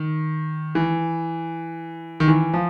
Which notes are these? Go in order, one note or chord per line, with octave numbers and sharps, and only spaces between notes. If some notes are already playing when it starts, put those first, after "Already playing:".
Already playing: D#3
E3
D#3
E3
F3